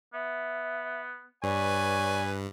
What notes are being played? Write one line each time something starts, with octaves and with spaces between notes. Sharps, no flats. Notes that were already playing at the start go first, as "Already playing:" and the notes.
B3 E5
G2 B4 C#5 D5 G#5